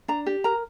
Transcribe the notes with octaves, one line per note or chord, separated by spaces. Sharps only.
D4 A#5
G4
A#4 A#5